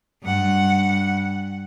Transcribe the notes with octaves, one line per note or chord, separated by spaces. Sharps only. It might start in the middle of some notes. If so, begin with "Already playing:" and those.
G2 F#5